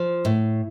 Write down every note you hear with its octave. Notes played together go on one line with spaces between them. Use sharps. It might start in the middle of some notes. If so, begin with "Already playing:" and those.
Already playing: F3
A2